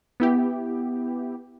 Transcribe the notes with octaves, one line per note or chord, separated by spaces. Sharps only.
B3 E4 G4